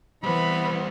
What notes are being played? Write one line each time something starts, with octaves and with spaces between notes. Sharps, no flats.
E3 G3 B3 C5 B5